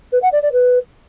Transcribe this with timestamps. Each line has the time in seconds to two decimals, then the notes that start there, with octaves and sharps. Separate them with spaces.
0.12 B4
0.22 F#5
0.32 D5
0.42 D5
0.52 B4